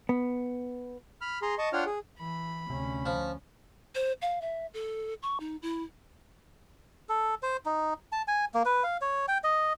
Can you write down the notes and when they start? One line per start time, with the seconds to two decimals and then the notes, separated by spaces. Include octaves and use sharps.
0.09 B3
1.21 B5 F6
1.42 G#4 A#5 C6
1.58 D#5 A5 C#6
1.73 D4 F4 C#5 F#5 G5 F6
1.86 G#4
2.19 E3 B5
2.70 D2 C3 C#4
3.06 F3
3.95 C5
4.22 F5
4.41 E5
4.74 A4
5.23 C#6
5.40 D#4
5.62 E4
7.09 A4
7.43 C5
7.65 D#4
8.12 A5
8.28 G#5
8.54 A#3
8.65 B4
8.83 F5
9.01 C#5
9.28 G5
9.44 D#5